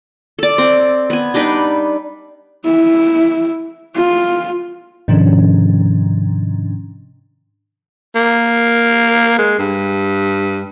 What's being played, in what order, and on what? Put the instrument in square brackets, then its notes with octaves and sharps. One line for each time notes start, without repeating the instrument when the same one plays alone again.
[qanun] A4 D5
C4
B3 G#5
G3 D4 D#4 B4
[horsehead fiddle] E4
F4
[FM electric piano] G#2 C3 D#3 F3 C#4 D4
[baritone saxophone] A#3
G#3
G2